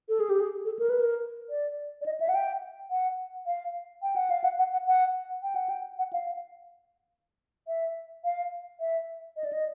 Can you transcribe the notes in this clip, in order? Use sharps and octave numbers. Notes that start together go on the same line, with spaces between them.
A4
G#4
G4
G#4
A4
A#4
B4
A#4
D5
D5
D#5
E5
F#5
G5
F#5
F5
G5
F#5
F5
F#5
F#5
F#5
F#5
G5
F#5
G5
F#5
F5
E5
F5
E5
D#5
D5
D#5